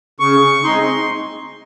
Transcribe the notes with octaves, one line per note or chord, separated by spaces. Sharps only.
C#3 C#6
G#3 C4 D#4 C6